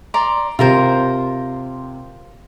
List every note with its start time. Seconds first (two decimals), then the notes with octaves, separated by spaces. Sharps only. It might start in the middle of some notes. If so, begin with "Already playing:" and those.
0.14 D5 A#5 C6
0.59 C3 F4 A#4 C5